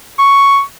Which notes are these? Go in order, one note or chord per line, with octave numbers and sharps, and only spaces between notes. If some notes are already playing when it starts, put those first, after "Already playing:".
C#6